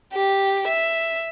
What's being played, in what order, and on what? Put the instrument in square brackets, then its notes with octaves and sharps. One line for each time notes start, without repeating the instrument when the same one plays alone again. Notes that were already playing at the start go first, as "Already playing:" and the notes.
[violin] G4
E5